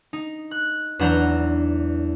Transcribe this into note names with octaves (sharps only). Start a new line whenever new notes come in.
D#4
F#6
E2 F#3 D4 F#5 A#5 G6